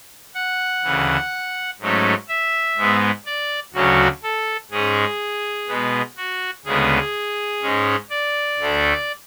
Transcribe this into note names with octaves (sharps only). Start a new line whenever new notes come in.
F#5
D2 C#3 E3
G#2 F#3 A3 C#4
E5
G#2 G#3 B3
D5
D2 C#3 F#3 C#4 F#4
A4
G#2 G#3 C#4 G#4
B2 G#3 B3
F#4
D2 C#3 G#3 B3 G#4
G#2 G#3 C#4
D5
D2 D3 A3